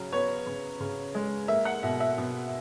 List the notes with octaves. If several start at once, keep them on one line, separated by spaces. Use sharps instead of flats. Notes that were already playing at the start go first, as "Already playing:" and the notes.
Already playing: C#3 F#3
B3 C#5
C#3
C#3
G#3
A#3 E5
F#5
B2 E5
E5
B2